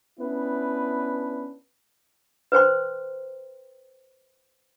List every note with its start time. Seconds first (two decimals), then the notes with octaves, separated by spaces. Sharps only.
0.20 B3 C#4 D4 E4 B4
2.52 B4 C5 G5 C6